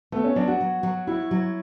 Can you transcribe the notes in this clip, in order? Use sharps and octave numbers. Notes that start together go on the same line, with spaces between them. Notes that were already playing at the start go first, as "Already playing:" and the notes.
A3 B3
C#4
F#3 D4
F#4
F#3
F#3
E4 F#4
F#3